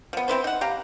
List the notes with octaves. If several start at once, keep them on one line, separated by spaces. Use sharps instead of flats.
F3 B3
C4 E4 B4 C5
D#4 F#5
G4 F5 A#5